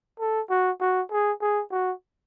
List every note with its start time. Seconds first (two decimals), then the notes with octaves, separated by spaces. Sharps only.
0.20 A4
0.50 F#4
0.81 F#4
1.11 G#4
1.41 G#4
1.71 F#4